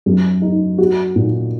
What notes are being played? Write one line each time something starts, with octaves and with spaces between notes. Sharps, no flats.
F#2
D#4
F#4
A#2